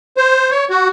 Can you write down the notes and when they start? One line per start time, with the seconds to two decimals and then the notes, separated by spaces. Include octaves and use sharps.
0.17 C5
0.51 C#5
0.70 F#4